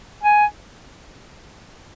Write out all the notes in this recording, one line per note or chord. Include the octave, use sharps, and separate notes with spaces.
G#5